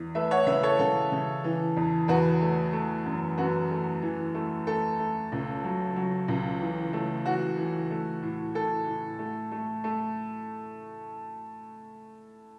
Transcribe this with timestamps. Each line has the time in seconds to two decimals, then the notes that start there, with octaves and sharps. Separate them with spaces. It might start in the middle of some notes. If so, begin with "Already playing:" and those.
Already playing: E2
0.15 A3 B4 E5
0.31 C#5 F#5
0.47 C#3 B4 E5
0.63 A4 C#5
0.79 C#3 A4
1.12 C#3
1.44 E3
1.77 E2
2.08 E2 F#4 B4
2.41 A3
2.73 A3
3.06 F#2
3.38 F#2 F#4 B4
3.70 A3
4.02 E3
4.34 A3
4.67 A3 A4
5.00 A3
5.32 C#2
5.64 F#3
5.96 F#3
6.28 C#2
6.61 E3
6.93 A3
7.26 E3 F#4
7.58 E3
7.91 A3
8.22 A2
8.55 A2 A4
8.87 A2
9.19 A3
9.52 A3
9.84 A3